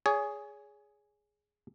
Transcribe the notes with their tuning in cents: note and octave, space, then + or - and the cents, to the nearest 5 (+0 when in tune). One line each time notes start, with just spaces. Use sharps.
G#4 +0 C#5 +35 G#5 +0